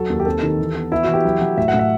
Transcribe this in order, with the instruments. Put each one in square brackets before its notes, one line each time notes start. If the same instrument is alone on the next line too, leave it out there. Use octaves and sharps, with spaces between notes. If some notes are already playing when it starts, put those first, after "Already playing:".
Already playing: [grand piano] F#3 [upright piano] A4
[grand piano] D#2
[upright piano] G4
[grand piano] C4 [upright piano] A4
[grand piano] D#3
E3
B3
[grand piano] B3 [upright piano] E4
[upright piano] F#4
[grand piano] E3
[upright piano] G4
[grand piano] F#3
F#3
[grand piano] A2 [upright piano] E5
[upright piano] F#5
[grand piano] A2
[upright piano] E5